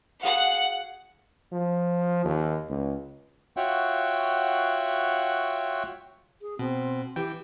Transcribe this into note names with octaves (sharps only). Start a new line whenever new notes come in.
F#4 G#4 F5 F#5
F3
D#2
C#2
F4 F#4 C#5 E5 F#5 G5
G#4
B2 C4
E3 G4 G5